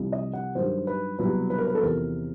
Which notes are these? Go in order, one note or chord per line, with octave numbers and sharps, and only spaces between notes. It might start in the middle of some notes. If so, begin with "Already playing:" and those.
Already playing: C2 C3 F3
D#5
F#5
G2 D#3 F#3 C5
B4
C2 B2 F#3 B4
B4
A#4
B4
A4
E2 C3 F3 A#4